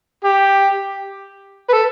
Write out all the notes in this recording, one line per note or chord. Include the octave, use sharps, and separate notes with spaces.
G4
B4
A4